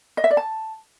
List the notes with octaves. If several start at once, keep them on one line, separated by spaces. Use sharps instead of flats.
D#5
E5
D5
A5